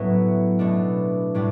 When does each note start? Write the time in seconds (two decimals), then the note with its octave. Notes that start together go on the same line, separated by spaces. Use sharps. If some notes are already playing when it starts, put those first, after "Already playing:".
Already playing: A2 F#3 B3 C#4 E4
0.59 B2 A3 D4
1.34 A2 G3 D4